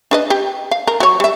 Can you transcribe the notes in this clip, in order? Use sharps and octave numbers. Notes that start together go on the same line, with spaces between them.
D4 B4 D#5
G4
F5
A#4
F#3 C#5
G3 E5